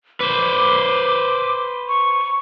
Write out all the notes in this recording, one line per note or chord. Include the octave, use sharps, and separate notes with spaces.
B4 C5 D6
C#6